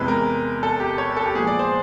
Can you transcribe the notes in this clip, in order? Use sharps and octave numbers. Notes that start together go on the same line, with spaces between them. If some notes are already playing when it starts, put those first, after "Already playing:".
Already playing: E2 C3 E3 G#3 B4
A#4
A4
G4
C#5
A4
G4
A#2 F3 G#3 B3 G#4
D5
C5